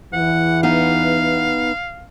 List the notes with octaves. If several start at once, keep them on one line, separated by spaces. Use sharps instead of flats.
E2 E3 F#5
B3 D#4 F5 F#5